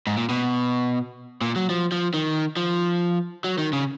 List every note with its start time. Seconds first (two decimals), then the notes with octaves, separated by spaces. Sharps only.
0.07 G#2
0.17 A#2
0.29 B2
1.41 A#2
1.56 F#3
1.70 F3
1.92 F3
2.14 D#3
2.57 F3
3.44 F#3
3.58 D#3
3.73 C#3